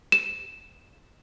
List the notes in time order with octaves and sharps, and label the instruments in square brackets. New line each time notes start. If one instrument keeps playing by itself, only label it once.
[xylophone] E7